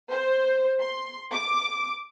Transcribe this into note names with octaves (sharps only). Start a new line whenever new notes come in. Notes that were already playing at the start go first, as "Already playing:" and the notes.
C5
C6
D6